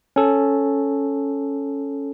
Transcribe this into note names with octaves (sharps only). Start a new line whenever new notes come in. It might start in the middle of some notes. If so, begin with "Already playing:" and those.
C#4 A4